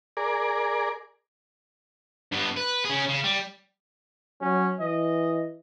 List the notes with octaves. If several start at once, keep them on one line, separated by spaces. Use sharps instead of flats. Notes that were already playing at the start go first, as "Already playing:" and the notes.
G#4 A#4 D5
G2 B3
B4
C#4 G#4
C#3
G3
F#3 C#4
E3 D#5